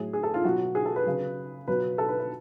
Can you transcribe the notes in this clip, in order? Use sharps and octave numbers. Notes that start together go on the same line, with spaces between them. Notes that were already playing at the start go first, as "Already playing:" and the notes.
Already playing: A2 F#3 G#4
G#4
A4
F4
B2 F#3 F#4
G#4
A4
B4
C#3 F#3
B2 F#3 B4
A4
B4
B4